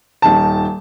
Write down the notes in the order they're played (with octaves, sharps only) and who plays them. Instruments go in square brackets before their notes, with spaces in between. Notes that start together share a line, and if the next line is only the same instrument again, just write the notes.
[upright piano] D#1 D#3 A5